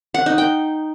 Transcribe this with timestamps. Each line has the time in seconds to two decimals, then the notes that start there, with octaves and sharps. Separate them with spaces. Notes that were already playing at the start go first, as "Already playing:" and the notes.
0.14 F#5
0.26 D#4
0.38 G5